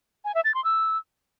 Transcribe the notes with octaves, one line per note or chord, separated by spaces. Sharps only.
G#5
E5
A6
C6
E6